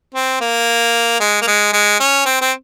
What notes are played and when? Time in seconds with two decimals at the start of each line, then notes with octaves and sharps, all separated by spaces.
0.15 C4
0.41 A#3
1.20 G#3
1.42 A#3
1.47 G#3
1.73 G#3
2.00 C#4
2.26 C4
2.41 C4